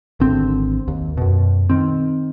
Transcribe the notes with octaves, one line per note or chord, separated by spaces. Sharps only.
G#1 D3 C4
D#2
F#2 B2
D#3 C4